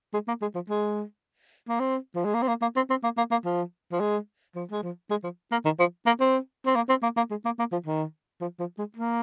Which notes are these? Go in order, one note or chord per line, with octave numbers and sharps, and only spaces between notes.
G#3
A#3
G#3
F3
G#3
A#3
C4
F3
G#3
A#3
C4
A#3
A#3
C4
C4
A#3
A#3
A#3
F3
F3
G#3
F3
G#3
F3
G#3
F3
A#3
D#3
F3
A#3
C4
C4
A#3
C4
A#3
A#3
G#3
A#3
A#3
F3
D#3
F3
F3
G#3
A#3